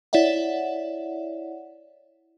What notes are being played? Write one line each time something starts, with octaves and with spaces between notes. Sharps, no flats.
E4 C#5 D5 E5 F#5